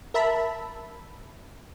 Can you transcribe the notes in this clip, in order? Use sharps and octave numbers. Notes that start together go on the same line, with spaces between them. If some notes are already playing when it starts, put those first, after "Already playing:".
A#4 E5 A5 B5